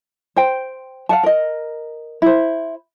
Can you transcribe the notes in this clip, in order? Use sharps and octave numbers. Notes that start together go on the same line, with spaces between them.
C5 G5
F5 F#5 A5
A#4 D#5
E4 C5